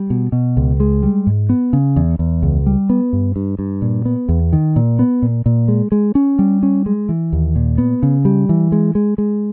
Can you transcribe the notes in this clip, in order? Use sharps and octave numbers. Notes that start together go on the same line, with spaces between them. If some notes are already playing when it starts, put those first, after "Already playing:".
Already playing: G3
B2
B2
C#2
G#3
G3
G#2
B3
C#3
E2
E2
C#2
G3
B3
G2
G2
G2
A#2
B3
E2
D#3
A#2
B3
A#2
A#2
G#3
G#3
C#4
G3
C#4
G#3
E3
D#2
A#2
B3
C#3
G3
E3
G#3
G#3
G#3